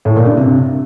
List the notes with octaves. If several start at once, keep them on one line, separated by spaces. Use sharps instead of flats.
A2
A#2
G2
C3